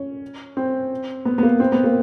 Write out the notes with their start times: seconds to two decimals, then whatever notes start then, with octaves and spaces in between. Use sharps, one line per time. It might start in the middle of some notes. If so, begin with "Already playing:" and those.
Already playing: C#4
0.57 C4
1.25 B3
1.38 B3
1.43 A#3
1.60 C4
1.72 B3
1.84 A#3